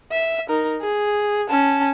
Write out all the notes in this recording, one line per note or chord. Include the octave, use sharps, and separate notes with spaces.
E5
D#4 A#4
G#4
C#4 A5